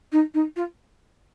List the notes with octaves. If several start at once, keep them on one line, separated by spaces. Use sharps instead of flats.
D#4
D#4
F4